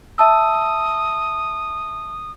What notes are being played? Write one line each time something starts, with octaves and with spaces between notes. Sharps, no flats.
E5 A5 D#6 E6